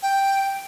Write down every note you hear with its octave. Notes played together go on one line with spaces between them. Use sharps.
G5